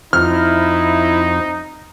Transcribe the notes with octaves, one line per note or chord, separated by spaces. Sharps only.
F2 C4 D#4 E4 F6